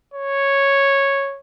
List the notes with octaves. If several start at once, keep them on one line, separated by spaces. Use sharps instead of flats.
C#5